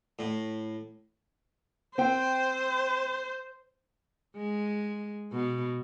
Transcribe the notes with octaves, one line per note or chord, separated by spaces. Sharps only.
A2
C4 C5 G5
G#3
B2